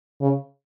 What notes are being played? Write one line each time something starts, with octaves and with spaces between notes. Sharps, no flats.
C#3